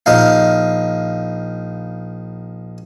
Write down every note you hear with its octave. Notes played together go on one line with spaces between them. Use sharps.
A#1 D#4 F5